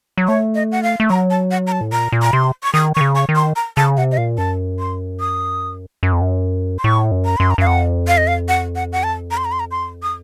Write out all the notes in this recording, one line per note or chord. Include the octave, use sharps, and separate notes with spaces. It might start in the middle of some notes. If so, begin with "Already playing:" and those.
F#3
A3 C#5
D#5
F#5
F5
A3
F#3 A#5
A5
F#5
A#5
A5
A2
A#2 A#5
A#2
A#5
C3 C6
C#6
D#3 D#6
D#3 C#6
C#3
C#6
D#3
C6
A#5
C#3 A5
C3 F#5
D#5
A#2 F5
F#2 A5
C6
D#6
F#2
F2
F#2
C6
A2 C#6
F#2
A#5
F#2 C6
A#5
F#2 F5
F2 F#5
F5
D#5
F5
F#5
F#5
F#5
A5
A#5
C6
A#5
C6
A#5
C6
D#6